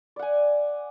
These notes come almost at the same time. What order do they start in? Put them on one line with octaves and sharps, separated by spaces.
D5 F#5 G#5